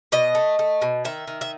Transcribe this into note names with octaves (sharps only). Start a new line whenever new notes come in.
B2 D#5
A3
A3
B2
D#3 E5
D#3
E5